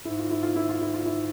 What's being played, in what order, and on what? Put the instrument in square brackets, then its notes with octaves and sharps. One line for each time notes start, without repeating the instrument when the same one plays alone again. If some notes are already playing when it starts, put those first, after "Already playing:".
[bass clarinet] G#2 [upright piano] E4
[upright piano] F4
E4
F4
E4
F4
E4
F4
E4